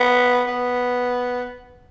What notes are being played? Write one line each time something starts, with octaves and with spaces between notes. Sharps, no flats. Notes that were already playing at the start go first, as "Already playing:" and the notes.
Already playing: B3
B3